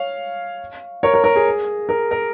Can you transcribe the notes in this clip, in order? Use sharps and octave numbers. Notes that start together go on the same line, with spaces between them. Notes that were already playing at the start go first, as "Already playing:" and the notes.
Already playing: C#5 F5
A#4 C#5
A#4
A#4
G#4
A#4
A#4